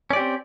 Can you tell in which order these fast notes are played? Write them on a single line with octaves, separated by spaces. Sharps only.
C#4 D5 G4 C4